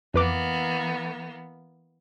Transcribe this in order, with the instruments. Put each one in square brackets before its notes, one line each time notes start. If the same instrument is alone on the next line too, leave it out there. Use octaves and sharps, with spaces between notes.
[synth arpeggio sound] F2 B4 D6 [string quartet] E3 A#3 B3